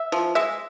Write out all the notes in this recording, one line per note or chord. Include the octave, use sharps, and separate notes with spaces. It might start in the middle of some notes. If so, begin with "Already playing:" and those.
Already playing: E5
F3
G#3 E5